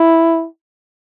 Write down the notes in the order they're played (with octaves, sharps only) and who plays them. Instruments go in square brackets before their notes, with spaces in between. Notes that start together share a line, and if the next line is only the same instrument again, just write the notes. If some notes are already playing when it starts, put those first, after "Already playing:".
Already playing: [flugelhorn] E4